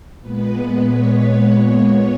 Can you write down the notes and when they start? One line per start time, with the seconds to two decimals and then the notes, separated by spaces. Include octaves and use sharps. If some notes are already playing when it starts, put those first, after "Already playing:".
0.20 A#2 G#3 B3 B4
0.86 C#5
1.52 A#2 G#3 B3